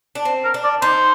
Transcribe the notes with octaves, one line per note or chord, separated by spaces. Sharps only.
D4
C4
A#4
D4
D5
D#4 C5